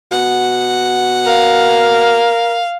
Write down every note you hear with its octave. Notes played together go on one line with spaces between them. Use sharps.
B2 F#5
A#4 F5